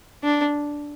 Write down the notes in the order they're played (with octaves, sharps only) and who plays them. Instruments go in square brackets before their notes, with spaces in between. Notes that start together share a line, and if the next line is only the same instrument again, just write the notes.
[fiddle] D4